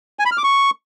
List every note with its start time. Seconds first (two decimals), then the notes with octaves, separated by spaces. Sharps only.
0.19 G#5
0.25 B5
0.32 F6
0.38 D6
0.44 C#6